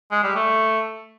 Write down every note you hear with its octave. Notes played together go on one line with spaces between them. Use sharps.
G#3
G3
A3